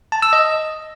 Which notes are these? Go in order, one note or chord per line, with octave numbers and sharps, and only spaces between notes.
A5
E6
D#5